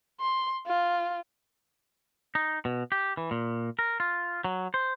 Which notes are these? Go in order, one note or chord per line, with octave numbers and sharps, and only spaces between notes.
C6
F4
D#4
B2
G4
E3
A#2
A#4
F4
F#3
C5